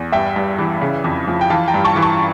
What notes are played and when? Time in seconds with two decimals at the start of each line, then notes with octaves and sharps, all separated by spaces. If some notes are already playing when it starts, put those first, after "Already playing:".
Already playing: E2
0.12 G2 E5 G5
0.36 G2
0.59 E3
0.81 C#3
1.04 F2
1.28 F3
1.41 G5
1.50 E3 F5 A5
1.68 G5 A#5
1.74 G2
1.84 A5 C#6
1.96 E3
2.02 A5 C#6